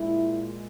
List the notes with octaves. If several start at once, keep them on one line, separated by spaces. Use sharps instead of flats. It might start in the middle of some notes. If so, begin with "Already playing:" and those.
Already playing: A#2 G#3 E4